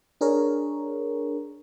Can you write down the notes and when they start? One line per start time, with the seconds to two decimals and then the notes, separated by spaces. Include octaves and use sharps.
0.21 D4 G#4 A#4 C#5